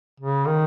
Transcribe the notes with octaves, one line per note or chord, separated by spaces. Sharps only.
C#3
D#3